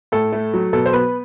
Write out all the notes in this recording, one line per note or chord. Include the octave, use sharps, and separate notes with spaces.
A2 A4
A3
F#3
B2 A4
C5
B3 B4